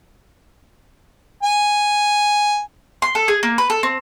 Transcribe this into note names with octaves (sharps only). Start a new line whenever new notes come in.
G#5
C6
A4
G#4
A#3
B4
A4
C4